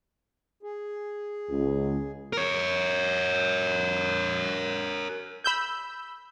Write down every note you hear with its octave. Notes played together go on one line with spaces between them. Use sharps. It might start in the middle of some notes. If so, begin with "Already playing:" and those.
G#4
C#2
A#4 C#5
B5 E6 G6